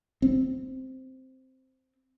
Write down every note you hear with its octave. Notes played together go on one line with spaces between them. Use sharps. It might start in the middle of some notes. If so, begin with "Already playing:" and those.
C4